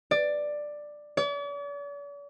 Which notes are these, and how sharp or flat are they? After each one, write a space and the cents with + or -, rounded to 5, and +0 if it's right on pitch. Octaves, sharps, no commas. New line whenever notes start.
D5 +10
D5 -45